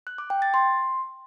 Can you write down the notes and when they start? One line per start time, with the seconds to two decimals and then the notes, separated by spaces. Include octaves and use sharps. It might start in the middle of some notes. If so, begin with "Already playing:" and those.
0.07 F#6
0.18 D6
0.30 G5
0.42 A6
0.54 C6